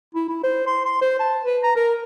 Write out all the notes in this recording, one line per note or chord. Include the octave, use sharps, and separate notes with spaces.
E4
E4
C5
C6
C6
C5
A5
B4
A#5
A#4